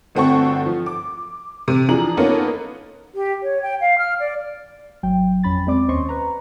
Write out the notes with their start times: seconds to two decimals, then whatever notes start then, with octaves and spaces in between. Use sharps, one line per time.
0.15 G1 A3 C4 F#4 A4 C#6
0.66 F3
0.86 D6
1.68 C3
1.89 E3 F3 D4 G#4 A#5 F#7
2.17 A#3 B3 C#4 D#4 F4 A4
3.14 G4
3.43 C#5
3.62 G5
3.80 F5
3.98 F6
4.19 D5
5.03 G#1 F#3 G5
5.43 F2 C#4 B5 A6
5.67 G#3 C4 D5 D6
5.88 D#2 C#4 C5 D#5 C6 C#6
6.09 B4 A#5